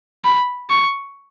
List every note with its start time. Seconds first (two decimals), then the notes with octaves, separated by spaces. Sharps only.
0.25 B5
0.70 C#6